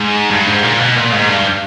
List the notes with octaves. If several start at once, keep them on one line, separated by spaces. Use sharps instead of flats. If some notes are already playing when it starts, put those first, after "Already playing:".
Already playing: G#2
G2
G#2
A#2
B2
A#2
G#2
G2